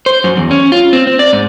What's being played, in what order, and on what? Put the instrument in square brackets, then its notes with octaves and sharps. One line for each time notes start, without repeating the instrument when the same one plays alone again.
[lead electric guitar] C5
F#2
E2
C#4
F4
C4
C4
D5
G#2